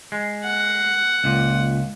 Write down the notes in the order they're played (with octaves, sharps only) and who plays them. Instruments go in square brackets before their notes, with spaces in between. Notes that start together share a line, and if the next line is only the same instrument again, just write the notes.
[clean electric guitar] G#3
[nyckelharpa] F#5
[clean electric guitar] C#2 A#2